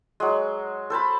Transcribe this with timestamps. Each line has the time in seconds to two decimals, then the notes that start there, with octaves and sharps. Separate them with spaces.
0.20 F#3 G#3
0.90 A4 C5 A5 B5